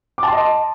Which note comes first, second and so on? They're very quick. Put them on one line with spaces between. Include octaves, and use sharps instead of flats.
D6 A5 C6 D#5